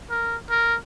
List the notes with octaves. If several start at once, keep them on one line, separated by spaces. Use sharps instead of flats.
A#4
A#4